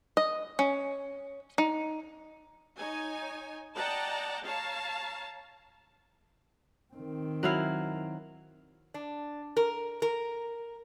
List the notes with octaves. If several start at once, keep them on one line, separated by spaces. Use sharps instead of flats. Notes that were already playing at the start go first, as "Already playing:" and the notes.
D#5
C#4
D#4
D#4 C#5 G#5
D5 D#5 F#5 G5 A5 A#5
C#5 F5 A5 A#5
D#3 C4
F#3 E4 F5
D4
A#4
A#4